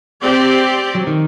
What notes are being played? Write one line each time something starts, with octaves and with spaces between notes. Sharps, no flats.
C4 G4 D5
F#3
D#3